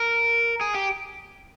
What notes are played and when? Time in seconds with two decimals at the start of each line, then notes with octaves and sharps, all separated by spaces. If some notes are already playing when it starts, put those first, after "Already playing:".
Already playing: A#4
0.61 G#4
0.75 G4